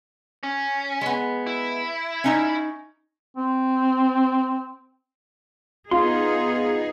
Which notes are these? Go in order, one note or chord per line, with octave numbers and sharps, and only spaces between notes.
C#4
G#3 B3
E4
C#4 D#4 A#5
C4
B3 D#4 F4 G#4 C6